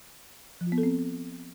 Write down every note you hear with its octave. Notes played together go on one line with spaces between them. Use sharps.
F3
F4
B3
A4
C4